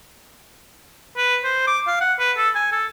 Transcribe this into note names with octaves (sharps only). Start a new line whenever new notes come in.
B4
C5
D6
F5
F#5
B4
A4
G#5
A4